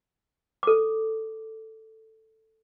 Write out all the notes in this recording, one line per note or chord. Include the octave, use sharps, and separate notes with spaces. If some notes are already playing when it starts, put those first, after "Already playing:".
A4 D6